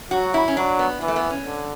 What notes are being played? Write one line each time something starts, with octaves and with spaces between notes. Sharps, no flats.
F#3 F#4
E4
C#4
F#3 D4
B3
E3 B3
A3
B3
C#4
D3